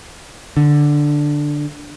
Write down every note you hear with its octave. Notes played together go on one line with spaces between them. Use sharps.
D3